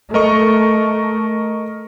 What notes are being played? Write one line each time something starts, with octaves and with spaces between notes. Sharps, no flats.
A3 A#4 D#5 C#6